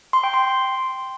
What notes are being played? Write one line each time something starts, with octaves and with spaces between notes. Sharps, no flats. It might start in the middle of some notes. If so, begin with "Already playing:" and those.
C6
G5
C6